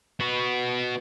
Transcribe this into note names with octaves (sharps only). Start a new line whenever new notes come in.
B3 F#4